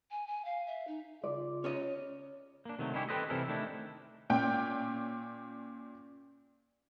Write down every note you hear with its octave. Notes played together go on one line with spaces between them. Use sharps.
G#5
G#5
F5
E5
D#4
C#3 F4 D5
C#4 C#5 D#5
A#3 D4
C3 D#3 F#3 A3
D#3 G3 C#4 E4 G4
G4 A4 B4 C5 D#5
C3 E3 G3 E4 A4 A#4
D#3 A3 D4 E4
A#2 C#4 G5